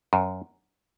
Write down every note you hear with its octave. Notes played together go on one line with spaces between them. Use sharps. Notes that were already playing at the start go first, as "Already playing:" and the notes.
F#2